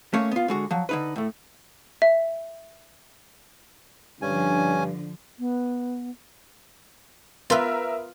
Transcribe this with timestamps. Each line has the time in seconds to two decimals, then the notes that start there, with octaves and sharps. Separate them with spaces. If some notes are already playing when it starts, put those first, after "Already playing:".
0.13 A3 A#3 C#4 C#5
0.31 B3 F4
0.48 D3 G#3 F#4
0.71 F3 F#3
0.89 D3 D#4 B4
1.16 A2 A3
2.02 E5
4.22 G2 D3 F3 C#4 G#5
5.39 B3
7.50 B3 F4 A#4 B4 E5